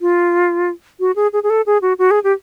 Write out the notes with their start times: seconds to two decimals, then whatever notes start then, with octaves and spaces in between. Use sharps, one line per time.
0.01 F4
1.00 F#4
1.16 G#4
1.33 G#4
1.43 G#4
1.50 A4
1.66 G#4
1.82 F#4
1.99 F#4
2.11 G#4
2.24 G4